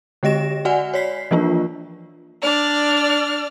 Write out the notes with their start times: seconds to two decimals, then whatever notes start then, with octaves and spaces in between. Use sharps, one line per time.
0.23 D3 G#3 G4 D#5 A#6 E7
0.65 F#4 D5 F#5 G#5
0.94 C#5 D5 B6 C7
1.31 E3 F3 A#3 D4 F4
2.41 D4 D5 F6